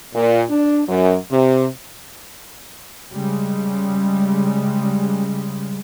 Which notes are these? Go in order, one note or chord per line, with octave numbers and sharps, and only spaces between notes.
A#2
D4
F#2
C3
C#3 G3 G#3